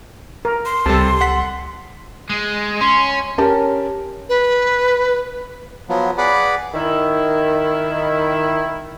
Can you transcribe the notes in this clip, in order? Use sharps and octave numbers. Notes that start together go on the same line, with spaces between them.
A#4
C6
C#2 C3 G3 A4 A5
F#5 B6
G#3
C#4 C6
C#4 G4 A#4 A5
B4
F3 F#3 B3
G#4 B4 D5 F#5 B5 D6
D#3 E4